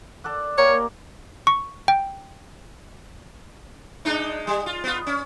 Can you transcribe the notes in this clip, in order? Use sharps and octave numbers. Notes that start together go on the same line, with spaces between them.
A4 D5 F#5
A#3 G4 A#4 C#5
C#6
G5
G#3 D4 D#4
G3
F4
B3 F4
C#4